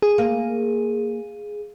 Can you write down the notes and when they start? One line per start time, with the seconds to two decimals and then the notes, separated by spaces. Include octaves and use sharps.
0.02 G#4
0.18 A#3